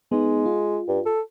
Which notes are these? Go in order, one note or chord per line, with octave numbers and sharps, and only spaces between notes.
G#3 B3 D#4
F4
G2
A4